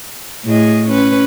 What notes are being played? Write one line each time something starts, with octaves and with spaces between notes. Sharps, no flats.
A2 G#4 D#5
C#4 B4